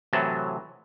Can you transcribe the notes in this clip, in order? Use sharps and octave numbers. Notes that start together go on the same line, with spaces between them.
A2 C3 E3 F#3 A5